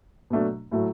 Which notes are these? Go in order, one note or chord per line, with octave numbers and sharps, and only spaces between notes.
B2 F#3 A3 D4
A2 F#3 A3